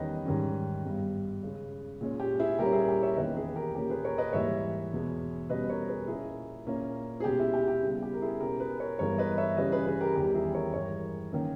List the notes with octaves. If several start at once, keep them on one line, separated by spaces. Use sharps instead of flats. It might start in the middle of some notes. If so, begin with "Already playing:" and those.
Already playing: E2 D#3 G3 C#4 B4 D#5
G#2 D#3 G3 C#4
G2 G3 B3
C#3 G#3 C#4
A#2 G#3 C#4
G4
E4 G#4
A#2 G3 A#3 C#4 G4 A#4
E4 G#4
G4
C#5 E5
E2 D#3 A#3 C#4 B4 D#5
G#4 B4
G4 A#4
A#2 A#3 C#4 G4 A#4
G#4 B4
A#4 C#5
B4 D#5
G#2 E3 G3 A#3 C#5 E5
E2 B2 G#3
B2 G3 C#4 B4 D#5
A#4 C#5
G#4 B4
A#2 A#3 C#4 E4 G#4
A#2 A#3 C#4
G#4
B2 G#3 C#4 G4
E4
G4
G4
C#3 G3 B3
G4
A#4
E4 G#4
B2 G#3 C#4 G4 A#4
G#4 B4
A#4 C#5
G2 E3 G#3 B3 A#4 C#5
B4 D#5
C#5 E5
C#3 E3 G3 C#4 B4 D#5
G#4 B4
G#4 B4
G4 A#4
E2 D#3 G3 G4
E4 G#4
A#4 C#5
G2 E3 G#3 A#4 C#5
D#3 A#3 C#4